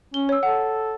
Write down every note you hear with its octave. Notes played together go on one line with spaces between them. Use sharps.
C#4 G7
C#5 E6
A4 F#5